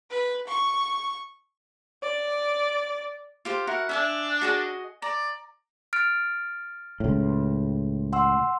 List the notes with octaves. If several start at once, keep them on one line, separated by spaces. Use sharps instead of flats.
B4
C#6
D5
F4 G4 C5
E4 F#4 A#4 F#5
D4 E5 F5 G#5
F#4 G#4 D#5
D5 A#5
F6 A6 D7
C#2 A2
F#5 C6 E6